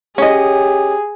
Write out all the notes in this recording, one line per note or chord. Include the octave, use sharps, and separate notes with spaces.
C#4 G4 G#4 D#5